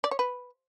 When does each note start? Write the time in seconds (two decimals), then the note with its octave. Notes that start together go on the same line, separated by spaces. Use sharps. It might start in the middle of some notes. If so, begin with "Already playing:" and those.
0.04 D5
0.11 C#5
0.19 B4